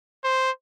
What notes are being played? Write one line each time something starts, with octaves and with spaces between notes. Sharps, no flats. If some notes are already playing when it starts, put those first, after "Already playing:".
C5